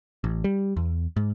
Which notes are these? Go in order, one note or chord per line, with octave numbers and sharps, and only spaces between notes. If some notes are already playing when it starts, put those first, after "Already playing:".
A1
G3
E2
G#2